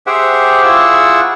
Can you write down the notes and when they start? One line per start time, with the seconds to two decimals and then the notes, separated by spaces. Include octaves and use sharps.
0.07 G4 G#4 C5 E5 F#5 G5
0.64 E4 F4 G#4 F#5 C#6 E6